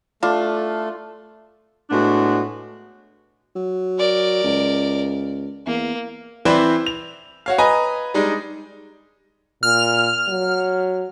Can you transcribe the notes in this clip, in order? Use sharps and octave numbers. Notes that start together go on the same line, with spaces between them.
A3 D4 F4
A2 G#3 B3 D4 F#4
F#3
A#4 D5
C#2
E2 A#3
E3 C4 E4 B4 C5 D5
F7
F#4 C#5 F5
B4 D#5 G#5 A#5
G3 G#3 D4 D#4
A#2 F6
F#3